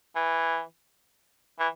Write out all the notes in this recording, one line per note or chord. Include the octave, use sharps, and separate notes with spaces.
E3
E3